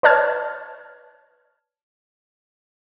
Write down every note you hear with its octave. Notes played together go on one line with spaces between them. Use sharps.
B4 C#5 D5 A5 F6 G#6